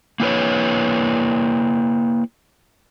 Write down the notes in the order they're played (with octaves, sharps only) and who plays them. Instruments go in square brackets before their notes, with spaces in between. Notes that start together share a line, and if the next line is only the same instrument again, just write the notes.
[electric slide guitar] A#3 E4 B4 C#5